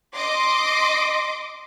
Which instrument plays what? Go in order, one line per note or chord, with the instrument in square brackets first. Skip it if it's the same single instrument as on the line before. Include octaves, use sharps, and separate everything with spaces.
[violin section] D#5 C6 D6